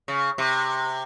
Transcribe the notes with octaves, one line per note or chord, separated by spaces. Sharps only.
C#3
C3